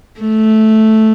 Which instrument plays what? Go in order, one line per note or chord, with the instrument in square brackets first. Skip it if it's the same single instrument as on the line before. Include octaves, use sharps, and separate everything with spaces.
[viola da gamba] A3